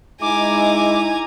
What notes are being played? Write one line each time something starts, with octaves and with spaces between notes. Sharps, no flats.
G#3 D#4 E4 G#5 A#5 D6